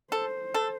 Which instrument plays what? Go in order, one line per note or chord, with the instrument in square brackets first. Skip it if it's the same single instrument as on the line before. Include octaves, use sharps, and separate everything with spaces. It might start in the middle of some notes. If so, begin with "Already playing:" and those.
[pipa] A4 [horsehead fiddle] C5
[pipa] A4